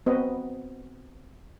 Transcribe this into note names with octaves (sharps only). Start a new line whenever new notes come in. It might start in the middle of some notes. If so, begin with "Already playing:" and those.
B3 C4 F#4 B4 C5 D#5